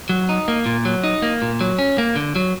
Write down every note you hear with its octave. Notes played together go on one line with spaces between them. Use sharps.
F#3
D#4
A#3
A#2
F#3
D#4
A#3
A#2
F#3
C#4
A#3
D3
F#3